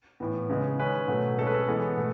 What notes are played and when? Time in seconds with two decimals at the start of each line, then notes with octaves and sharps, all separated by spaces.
0.20 A2 E3 B3
0.49 C#3 G#3 B3
0.79 D#3 G#3 C#4 B4
1.08 B2 F#3 A3 C#4
1.38 B2 G#3 C#4 A4
1.47 B4
1.54 A4
1.68 E3 G#3 B3
1.97 B2 A3